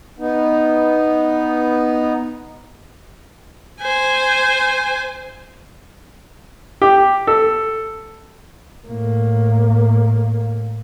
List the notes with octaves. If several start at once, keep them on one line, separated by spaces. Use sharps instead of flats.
B3 D#4
C5 G#5
G4
A4
A2 A#3